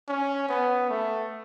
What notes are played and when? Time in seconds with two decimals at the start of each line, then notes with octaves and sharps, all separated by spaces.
0.08 C#4
0.49 B3
0.89 A3